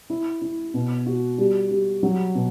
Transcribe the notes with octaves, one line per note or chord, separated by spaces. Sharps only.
E4
E4
B2
F#4
G3
G3
F#3
B2